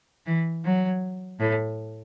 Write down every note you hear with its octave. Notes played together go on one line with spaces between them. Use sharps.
E3
F#3
A2